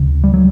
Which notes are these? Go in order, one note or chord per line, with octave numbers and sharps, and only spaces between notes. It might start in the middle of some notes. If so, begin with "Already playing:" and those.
Already playing: D2 C#3
G3
F#3